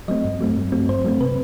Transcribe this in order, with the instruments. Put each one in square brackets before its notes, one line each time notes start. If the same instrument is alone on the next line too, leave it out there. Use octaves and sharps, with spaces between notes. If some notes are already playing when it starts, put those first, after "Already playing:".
[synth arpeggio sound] F#3 A3 C4 D#5
G2
F#3 A3 C4
G2
F#3 A3 C4
G2 C5
F#3 A3 C4
C3 B4